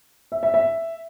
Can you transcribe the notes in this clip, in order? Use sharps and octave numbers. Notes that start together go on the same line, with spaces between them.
E5
E5
E5